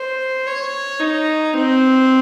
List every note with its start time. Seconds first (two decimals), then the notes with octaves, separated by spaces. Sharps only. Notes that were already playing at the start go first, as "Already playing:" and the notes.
Already playing: C5
0.47 C#5
1.00 D#4
1.54 C4